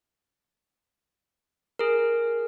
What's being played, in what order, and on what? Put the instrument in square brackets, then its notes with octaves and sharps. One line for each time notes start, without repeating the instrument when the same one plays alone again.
[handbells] G#4 A#4